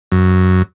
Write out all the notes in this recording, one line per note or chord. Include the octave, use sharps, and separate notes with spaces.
F#2